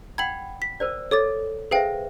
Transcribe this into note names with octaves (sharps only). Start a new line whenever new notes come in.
F#5 G5 B5 G#6 F#7
B6
A#4 C5 D5
A4 C#5 D6 A6
G#4 B4 C5 E5 F5 G5